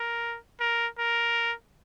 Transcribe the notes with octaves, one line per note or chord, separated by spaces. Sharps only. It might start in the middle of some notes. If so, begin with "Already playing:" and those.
Already playing: A#4
A#4
A#4